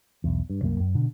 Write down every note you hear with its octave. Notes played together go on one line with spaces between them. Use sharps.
B1 E2
G2
C2 F#2 F#3 A#3
F#2
B2 D3